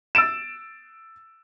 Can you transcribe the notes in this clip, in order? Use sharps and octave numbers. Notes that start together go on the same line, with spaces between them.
E6 A6 D7 E7